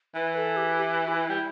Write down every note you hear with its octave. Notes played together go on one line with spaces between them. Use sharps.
E3 B4
A4
G4
G4
E4
G3